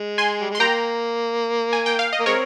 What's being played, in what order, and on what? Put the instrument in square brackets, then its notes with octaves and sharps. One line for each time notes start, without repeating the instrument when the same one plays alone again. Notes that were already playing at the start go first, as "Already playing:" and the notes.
Already playing: [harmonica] G#3
[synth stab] G#5 C6
[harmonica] G3
[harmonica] G#3 [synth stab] C6
[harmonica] G3 A#3 [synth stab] G5 A#5
[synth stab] G#5
G5
F5
D#5
[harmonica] A#3
[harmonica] G#3 C4 [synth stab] A#4 C#5